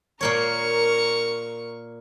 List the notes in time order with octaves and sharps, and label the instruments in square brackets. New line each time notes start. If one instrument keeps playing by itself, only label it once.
[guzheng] A#2 A#3 C#5 [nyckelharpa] A#4 [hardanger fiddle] C#6